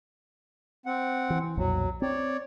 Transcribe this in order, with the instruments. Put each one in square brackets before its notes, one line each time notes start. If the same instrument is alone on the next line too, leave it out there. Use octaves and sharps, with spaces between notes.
[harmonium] C4 F#5
[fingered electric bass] E3
[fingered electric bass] B1 F2 A#2 [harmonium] F#3
[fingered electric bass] C4 [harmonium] C#5 D5